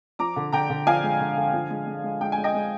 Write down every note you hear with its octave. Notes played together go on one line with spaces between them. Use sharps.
F3 A#5 D6
D3
D3 G5 A#5
D3
F3 F5 G#5
G#3
D3
D3
F3
G#3
G#3
G#3
G#3 G5
G#5
G#3
D#5 G5
G#3